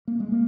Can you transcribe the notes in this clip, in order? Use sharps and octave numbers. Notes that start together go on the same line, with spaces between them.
A#3
G#3
A#3